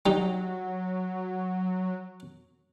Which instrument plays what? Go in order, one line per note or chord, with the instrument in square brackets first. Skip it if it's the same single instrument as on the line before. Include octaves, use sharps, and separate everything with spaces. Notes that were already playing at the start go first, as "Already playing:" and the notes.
[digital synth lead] F#3 [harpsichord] G3 D#4